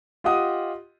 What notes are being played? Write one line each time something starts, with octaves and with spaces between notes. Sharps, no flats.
F4 G4 D#5 F#5 D#6